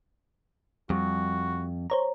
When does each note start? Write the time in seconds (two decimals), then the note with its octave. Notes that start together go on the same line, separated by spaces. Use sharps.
0.90 F2 G3 F#4
1.90 C5 C#5 A#5